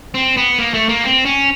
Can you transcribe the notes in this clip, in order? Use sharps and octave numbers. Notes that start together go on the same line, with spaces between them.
C4
B3
A#3
A3
A#3
C4
C#4